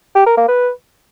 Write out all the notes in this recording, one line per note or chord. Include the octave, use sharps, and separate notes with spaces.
G4
A#4
A#3
B4